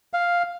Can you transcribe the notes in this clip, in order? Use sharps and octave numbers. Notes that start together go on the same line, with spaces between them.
F5